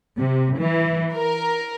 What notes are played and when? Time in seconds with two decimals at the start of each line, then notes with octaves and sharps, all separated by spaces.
0.18 C3
0.58 E3
1.14 A#4